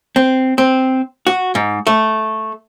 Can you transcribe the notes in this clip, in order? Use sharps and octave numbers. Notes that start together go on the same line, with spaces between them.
C4
C4
F#4
G#2
A3